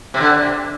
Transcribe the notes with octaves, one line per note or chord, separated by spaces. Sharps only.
C3
D3
C3